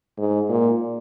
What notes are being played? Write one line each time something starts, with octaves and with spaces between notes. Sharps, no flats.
G#2
A#2